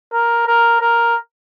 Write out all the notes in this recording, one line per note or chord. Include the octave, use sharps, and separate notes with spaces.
A#4
A#4
A#4